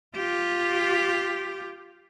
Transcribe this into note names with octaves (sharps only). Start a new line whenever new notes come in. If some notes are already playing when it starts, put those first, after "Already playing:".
F4 G4